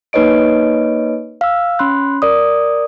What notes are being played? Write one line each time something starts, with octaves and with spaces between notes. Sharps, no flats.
A#3 D#4 B4 C#5 D#5 D7
F5 E6
C#4 B5 C6 F#6
A#4 D5 D#6